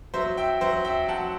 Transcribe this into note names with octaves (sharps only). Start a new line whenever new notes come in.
F#3 C5 E5
E5 G5
F#3 C5 E5
E5 G5
F#3 F#5 A5